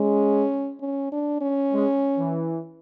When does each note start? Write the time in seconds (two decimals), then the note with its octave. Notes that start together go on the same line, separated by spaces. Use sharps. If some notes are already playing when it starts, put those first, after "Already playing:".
Already playing: G#3 C#4
0.81 C#4
1.12 D4
1.41 C#4
1.72 G#3
2.18 E3